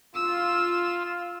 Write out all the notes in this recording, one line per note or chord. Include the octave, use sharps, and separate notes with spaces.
F4 E6